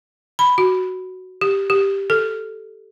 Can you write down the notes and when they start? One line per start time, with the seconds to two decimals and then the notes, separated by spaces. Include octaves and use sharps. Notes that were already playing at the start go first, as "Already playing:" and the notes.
0.39 B5
0.58 F#4
1.41 G4
1.70 G4
2.10 A4